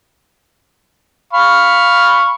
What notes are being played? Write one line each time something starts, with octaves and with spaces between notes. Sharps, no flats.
F5 B5 C#6